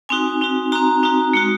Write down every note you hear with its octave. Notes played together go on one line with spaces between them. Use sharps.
C4 D#4 F#4 G#5
C4 D#4 F#4
C4 D#4 F#4 A#5
C4 D#4 F#4
G#3 D#4 F#4